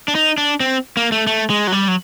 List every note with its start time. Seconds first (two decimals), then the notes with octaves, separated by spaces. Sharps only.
0.08 D4
0.15 D#4
0.38 D4
0.60 C4
0.97 A#3
1.12 A3
1.27 A3
1.50 G#3
1.67 F#3
1.72 G3
1.88 F#3